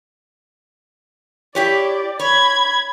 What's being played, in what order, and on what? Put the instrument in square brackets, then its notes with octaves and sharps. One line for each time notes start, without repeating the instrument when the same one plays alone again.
[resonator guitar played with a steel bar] E4 G4 C#5 [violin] D5
[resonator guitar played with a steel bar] C#5 [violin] B5 G#6